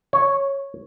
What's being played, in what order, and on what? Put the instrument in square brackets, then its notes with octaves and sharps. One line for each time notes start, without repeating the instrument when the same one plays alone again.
[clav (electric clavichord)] C#5